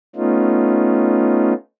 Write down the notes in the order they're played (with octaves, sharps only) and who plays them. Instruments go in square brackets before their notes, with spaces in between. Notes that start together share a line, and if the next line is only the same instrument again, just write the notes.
[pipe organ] A3 B3 C#4 D#4 F4